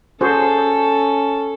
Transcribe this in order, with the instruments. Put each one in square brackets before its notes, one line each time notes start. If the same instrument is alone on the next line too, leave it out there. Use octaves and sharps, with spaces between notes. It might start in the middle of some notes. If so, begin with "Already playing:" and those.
[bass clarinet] C#4 [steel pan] F#4 G#4 C5 [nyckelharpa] A4